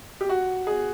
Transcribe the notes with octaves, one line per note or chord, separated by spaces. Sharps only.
G4
F#4
G#4